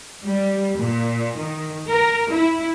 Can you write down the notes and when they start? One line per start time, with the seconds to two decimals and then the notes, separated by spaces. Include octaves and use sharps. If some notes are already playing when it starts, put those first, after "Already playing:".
0.25 G3
0.80 A#2
1.38 D#3
1.88 A#4
2.32 E4